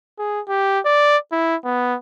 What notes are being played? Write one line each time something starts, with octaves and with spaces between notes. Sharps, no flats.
G#4
G4
D5
E4
B3